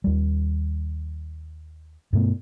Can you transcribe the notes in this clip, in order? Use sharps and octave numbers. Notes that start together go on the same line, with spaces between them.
D#2 G3
G2 B2 A3 B3